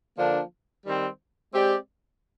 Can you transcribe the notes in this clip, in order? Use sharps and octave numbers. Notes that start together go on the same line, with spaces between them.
D3 F3 A#3 D4
D#3 G3 C4
G#3 C4 G4 D5